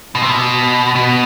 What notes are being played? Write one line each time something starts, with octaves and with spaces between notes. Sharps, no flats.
B2
C3
B2
B2